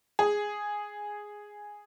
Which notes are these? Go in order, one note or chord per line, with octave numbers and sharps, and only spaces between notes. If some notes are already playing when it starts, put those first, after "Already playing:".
G#4